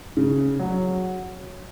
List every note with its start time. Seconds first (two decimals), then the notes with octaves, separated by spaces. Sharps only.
0.17 C#3
0.59 F#3